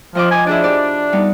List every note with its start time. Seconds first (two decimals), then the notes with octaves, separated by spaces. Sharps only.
0.15 F2 F3 D#5 D6
0.31 G#5
0.47 D4 E4 G#4 D5
0.64 G4 D5
1.13 G3 B3 D#4